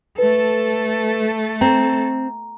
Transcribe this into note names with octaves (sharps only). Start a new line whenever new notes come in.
A3 A4 B4
C4 A#5